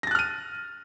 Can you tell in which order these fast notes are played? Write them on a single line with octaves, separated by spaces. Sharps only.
A#6 A6 F#6 F6 D#7